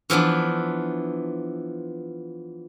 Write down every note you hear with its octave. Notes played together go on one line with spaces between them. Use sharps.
E3 F3 B3 D4